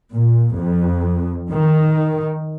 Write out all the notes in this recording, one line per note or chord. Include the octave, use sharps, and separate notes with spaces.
A#2
F2
D#3